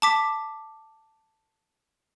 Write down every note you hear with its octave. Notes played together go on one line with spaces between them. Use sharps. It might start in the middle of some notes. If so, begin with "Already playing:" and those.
A5 D6 B6